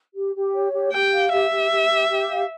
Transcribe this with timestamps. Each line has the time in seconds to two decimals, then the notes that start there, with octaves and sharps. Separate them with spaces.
0.15 G4
0.35 G4
0.54 C#5
0.73 G4
0.93 G4 G5
1.13 F5
1.32 G4 E5
1.51 G4
1.71 G4
1.90 G4
2.09 G4
2.29 F5